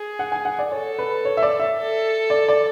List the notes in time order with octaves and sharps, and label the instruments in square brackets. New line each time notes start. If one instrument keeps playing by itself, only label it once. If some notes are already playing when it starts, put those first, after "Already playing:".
Already playing: [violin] G#4
[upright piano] F#5
G#5
F#5
D5
[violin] A4 [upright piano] C#5
[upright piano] B4
C#5
E5
D5
E5
[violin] A4
[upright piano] D5
D5